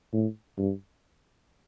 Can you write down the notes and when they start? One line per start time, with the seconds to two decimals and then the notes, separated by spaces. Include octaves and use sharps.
0.13 A2
0.58 G2